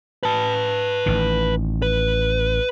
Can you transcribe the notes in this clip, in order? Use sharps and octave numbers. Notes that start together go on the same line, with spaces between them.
B4 A5
A1 D#3
B4